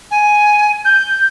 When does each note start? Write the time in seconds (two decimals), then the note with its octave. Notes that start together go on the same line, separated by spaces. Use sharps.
0.10 G#5
0.84 G6